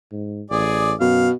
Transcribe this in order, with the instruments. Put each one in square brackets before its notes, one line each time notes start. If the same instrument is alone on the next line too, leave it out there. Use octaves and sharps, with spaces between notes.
[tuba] G#2
[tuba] A1 [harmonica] G#4 D5
[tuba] F#2 [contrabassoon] B2 [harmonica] F5